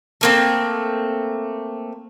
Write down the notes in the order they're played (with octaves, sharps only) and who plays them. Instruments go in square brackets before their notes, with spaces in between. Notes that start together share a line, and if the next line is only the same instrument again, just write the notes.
[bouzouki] A3 A#3 C4